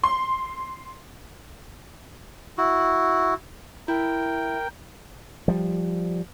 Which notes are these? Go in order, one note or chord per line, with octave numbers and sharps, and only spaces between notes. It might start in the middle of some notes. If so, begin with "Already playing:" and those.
C6
E4 F#4
E4 A#4 G5
F3 G3